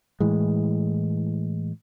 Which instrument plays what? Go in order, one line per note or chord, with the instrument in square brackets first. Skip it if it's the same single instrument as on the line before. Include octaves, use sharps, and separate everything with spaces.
[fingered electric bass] A2 E3 G#3